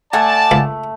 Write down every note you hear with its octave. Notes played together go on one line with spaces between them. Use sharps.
A3 D5 F#5 G#5 A5
C#2 F5 B5